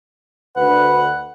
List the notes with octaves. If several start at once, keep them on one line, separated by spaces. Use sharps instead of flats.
D2 D3 B4 F#5